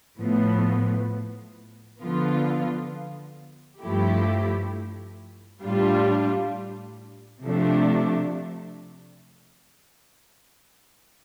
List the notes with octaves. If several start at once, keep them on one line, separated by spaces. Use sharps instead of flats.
A2 F3 B3
D3 F3 B3 F4
G2 F3 A3 E4 G4
A2 G3 D4 F4
C3 F3 A3 D4